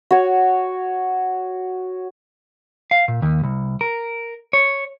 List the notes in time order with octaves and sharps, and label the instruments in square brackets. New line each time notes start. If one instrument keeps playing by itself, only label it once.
[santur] F#4 C#5
[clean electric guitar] F5
A#2
D#2
C2
A#4
C#5